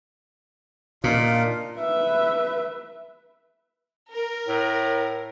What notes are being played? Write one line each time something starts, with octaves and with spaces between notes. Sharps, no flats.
A#2 D4 D#4 F4
B4 E5
A#4
A2